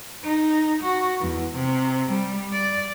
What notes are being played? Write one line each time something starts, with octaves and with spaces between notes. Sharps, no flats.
D#4
F#4
E2
C3
G3
D5